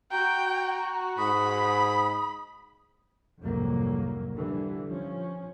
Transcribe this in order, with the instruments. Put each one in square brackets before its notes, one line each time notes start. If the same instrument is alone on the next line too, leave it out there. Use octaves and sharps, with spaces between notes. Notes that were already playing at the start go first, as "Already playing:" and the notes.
[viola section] F#4 [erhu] G5 [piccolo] A#5
[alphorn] G#2 [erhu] B5 [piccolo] D#6
[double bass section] C2 F2 G#2 F#3 A#3
D3 E3 G3
F3 C#4